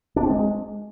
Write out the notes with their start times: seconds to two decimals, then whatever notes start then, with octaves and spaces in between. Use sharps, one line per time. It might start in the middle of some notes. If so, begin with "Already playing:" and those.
0.16 D4
0.23 C4
0.30 G#3